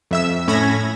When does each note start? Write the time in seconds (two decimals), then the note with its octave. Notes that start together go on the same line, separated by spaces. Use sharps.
0.11 F2 E5 E6
0.48 A2 C#4 B5 G#6 A#6